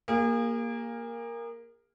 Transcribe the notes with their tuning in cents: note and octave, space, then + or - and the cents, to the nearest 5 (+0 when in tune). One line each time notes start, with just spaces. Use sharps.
A#3 +0 F4 +10 G#4 -35